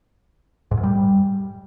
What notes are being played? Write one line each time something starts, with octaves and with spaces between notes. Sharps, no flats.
G#2
F#2
G3